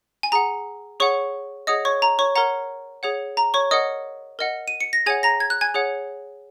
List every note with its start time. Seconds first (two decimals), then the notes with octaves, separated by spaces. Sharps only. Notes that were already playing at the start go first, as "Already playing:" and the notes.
0.23 G#5
0.32 G#4 F#5 A#5
1.00 G#4 C#5 F#5 C#6
1.67 G#4 C#5 D#5 F#5 D#6
1.85 C#5 C#6
2.02 A#5
2.19 C#5 C#6
2.35 A#4 C#5 F#5 A#5
3.03 G#4 C#5 F#5
3.37 A#5
3.54 C#5 C#6
3.71 A#4 C#5 D#5 F#5 D#6
4.39 A#4 D#5 F#5
4.68 D#7
4.81 C#7
4.93 A#6
5.06 G#4 C#5 F#5 G#5 G#6
5.23 A#5 A#6
5.40 G#6
5.50 F#6
5.61 G#5 G#6
5.74 G#4 C#5 F#5